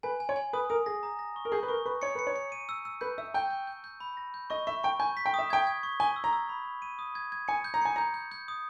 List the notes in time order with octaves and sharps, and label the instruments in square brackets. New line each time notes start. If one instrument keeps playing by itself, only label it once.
[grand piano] B4 [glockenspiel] G#5
[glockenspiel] G#5
[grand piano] C#5
[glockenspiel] G#5
[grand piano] B4 [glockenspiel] D#6
[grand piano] A#4 [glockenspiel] D#6
[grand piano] G#4 [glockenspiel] A#6
[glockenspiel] A#5
A#6
C#6
[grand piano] A#4
[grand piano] G#4 [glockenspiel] G6
[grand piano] B4
[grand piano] A#4 [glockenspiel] C#6
[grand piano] B4 [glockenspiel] C#6
[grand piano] C#5 [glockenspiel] C#7
[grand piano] B4 [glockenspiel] C#7
[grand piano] C#5
[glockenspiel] C#7
D#7
E6
E6
[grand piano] B4 [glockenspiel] G6
[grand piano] E5 [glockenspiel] E6
[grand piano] G5 [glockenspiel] G6
[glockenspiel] G6
G6
G6
B5
A#6
G6
[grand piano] D#5 [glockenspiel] C#6
[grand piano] E5 [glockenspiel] C#6
[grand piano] G5 [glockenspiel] C#6
[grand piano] G#5 [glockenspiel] G6
[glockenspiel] B6
[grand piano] G5
[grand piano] E5 [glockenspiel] D#6
[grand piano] G5 [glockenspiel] G#6
[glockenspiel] G#6
C#6
[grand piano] G#5 [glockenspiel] G7
[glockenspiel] E6
[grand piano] A#5
[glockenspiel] E6
B5
B5
D#7
D#6
G#6
G#6
[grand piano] G#5 [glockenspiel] C#7
[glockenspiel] G6
[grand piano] A#5
[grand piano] G#5 [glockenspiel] C#7
[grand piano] A#5 [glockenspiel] G6
[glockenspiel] G6
G6
D#6